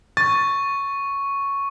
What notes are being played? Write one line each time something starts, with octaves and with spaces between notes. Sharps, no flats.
C#6 A6